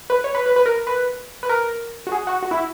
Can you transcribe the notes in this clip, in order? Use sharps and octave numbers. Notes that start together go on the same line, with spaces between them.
B4
C#5
B4
B4
B4
A#4
B4
B4
A#4
F#4
G#4
F#4
F#4
E4